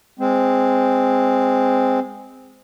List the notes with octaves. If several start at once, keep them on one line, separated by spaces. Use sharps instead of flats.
G#3 C4